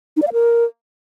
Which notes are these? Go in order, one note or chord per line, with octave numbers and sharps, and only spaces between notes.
D#4
D5
F5
A#4